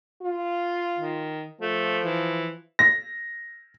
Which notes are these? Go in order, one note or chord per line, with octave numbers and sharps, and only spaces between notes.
F4
D#3
F3 A3
E3
A#6